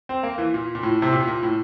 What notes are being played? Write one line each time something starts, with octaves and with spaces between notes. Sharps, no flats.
C4
A#3
E3
A#2
A#2
A2
C3
A#2
A#2
A2